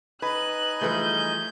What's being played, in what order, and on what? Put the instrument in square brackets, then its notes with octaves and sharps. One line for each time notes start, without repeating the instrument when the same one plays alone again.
[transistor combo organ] D#4 G#5 [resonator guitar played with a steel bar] B4 [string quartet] F#6
[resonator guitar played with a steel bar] E3 F3 G3 [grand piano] A3 G#4 B4 [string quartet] G6